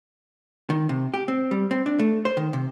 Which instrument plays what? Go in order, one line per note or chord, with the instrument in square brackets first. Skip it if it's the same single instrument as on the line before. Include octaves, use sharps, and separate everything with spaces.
[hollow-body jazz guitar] D#3
C3
G4
C4
G3
C4
D4
A3
C5
D#3
C3